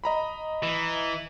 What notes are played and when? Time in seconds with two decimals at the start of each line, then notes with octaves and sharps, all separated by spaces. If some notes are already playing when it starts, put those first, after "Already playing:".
0.04 D#5 A#5 B5
0.63 E3